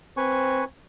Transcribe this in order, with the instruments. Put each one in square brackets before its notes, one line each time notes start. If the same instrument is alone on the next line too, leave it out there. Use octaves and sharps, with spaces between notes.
[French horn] C4 [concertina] B4 G#5 C#6